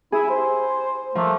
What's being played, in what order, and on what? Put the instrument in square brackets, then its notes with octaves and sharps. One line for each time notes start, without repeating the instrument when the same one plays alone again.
[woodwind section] E4 [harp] G#4
[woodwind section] C5
[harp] F3 [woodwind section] A3 A#3